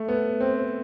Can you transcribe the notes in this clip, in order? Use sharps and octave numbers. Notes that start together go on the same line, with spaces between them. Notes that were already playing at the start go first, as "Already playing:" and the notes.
Already playing: A3
B3
C4